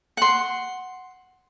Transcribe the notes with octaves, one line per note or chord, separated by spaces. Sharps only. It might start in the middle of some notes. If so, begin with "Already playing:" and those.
F#5 C6